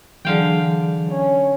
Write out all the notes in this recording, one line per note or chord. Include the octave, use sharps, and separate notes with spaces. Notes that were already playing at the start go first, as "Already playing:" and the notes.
D3 E3 F#3 G#4 F5 G5
C#4